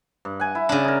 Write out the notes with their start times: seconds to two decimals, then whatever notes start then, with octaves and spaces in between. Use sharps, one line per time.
0.25 G2
0.40 F#5 G#5
0.55 E4
0.69 C#3 D4
0.84 D#4 A#4